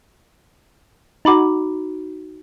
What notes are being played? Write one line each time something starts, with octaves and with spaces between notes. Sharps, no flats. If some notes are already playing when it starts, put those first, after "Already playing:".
D#4 F#4 A#5 B5 D6